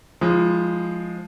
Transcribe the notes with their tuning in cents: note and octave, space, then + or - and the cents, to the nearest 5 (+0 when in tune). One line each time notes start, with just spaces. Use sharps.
F3 +0 G#3 +0 E4 -35